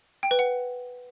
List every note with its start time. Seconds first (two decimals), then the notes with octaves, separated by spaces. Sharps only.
0.23 G5
0.31 B4
0.39 F#5